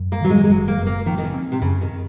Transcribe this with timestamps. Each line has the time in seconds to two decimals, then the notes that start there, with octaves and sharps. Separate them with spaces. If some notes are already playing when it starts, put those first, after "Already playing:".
Already playing: F#2
0.12 A#3
0.21 D#3 F#3
0.30 G#3
0.44 G#3
0.49 F#1 F#3
0.68 A#3
0.78 F#1
0.87 A#3
1.06 D#3 F3
1.18 D#3
1.24 C#3
1.34 C4
1.52 C3
1.62 F#2 C#3
1.81 D#3